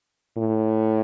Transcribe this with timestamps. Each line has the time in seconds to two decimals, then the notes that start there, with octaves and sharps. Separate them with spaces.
0.38 A2